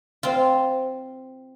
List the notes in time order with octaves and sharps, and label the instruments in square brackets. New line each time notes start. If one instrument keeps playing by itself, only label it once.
[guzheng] C4 F4